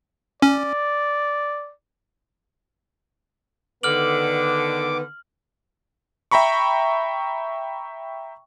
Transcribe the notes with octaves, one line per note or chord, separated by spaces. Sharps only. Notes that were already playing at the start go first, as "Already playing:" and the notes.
C#4 D5
D3 D#3 B3 B4 D6 F6 F#7
E5 G5 A#5 B5 C#6